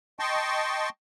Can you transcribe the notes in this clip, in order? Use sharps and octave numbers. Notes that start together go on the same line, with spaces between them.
D#5 G5 A5 C6 C#6